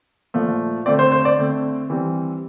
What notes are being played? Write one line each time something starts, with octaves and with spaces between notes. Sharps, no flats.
A#2 F3 A3
D3 A3 C4 D5
C5
C5
D5
D3 A3 C4
E3 G3 C4